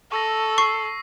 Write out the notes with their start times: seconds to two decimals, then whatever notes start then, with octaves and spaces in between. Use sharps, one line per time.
0.12 A4 C#6 E6 A#6
0.58 C#6 C7